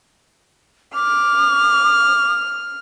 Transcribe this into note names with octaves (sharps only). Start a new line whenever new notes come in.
D6 F6